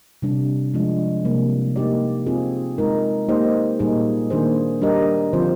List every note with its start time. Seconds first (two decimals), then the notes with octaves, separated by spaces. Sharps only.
0.22 C3 G3 D4
0.74 F3 G#3 D4
1.25 C3 G3 A#3
1.76 A#3 D#4 G4 D5
2.26 C4 F4 G#4
2.78 G#3 D#4 A#4
3.28 A#3 D#4 G4 C5 D#5
3.79 A#2 G3 A#3 D#4 G#4
4.30 D#3 A#3 D4 G#4 C5
4.82 G3 D4 G4 A#4 D#5
5.33 D3 F3 C4 F4 C5